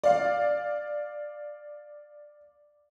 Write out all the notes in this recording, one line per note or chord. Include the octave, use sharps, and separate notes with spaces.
D5 F5